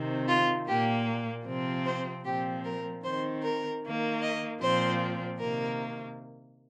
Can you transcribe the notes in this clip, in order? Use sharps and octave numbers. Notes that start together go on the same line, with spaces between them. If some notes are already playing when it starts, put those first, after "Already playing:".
Already playing: C3 D#3 C4
F4
A#2 A#3 G4
C3 F3 C4
C5
A#2 F3 C4 G4
A#4
D#3 C4 C5
A#4
D#3 A#3
D#5
A#2 F3 C4 C5
C3 D#3 A#3 A#4